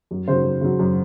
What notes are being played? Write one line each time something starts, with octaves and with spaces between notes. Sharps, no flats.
F#2
C#3 F#3 C5
F#2
C#3 F#3
F#2